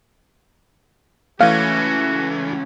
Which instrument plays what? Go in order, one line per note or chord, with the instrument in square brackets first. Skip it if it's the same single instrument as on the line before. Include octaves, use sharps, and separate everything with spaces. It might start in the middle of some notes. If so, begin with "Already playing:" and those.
[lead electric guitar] C#2 C#4 [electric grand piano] E3 A3 [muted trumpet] F#4 [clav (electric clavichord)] F5